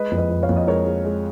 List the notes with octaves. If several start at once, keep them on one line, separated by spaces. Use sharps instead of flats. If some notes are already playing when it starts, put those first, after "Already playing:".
Already playing: G#3 B4 D#5
F2
B4 D#5
F2
C#5 F5
F2
D#5
G#3 A#4 C#5
G#3
G#3